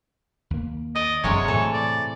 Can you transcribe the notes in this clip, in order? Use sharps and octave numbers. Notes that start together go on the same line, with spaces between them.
D#2 A#3
D5 D#5
E1 F#2 C3 F#3 G#3 C#5
A2 E3 A4
D5